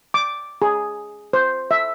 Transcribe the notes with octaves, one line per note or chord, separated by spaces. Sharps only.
D6
G#4
C5
E5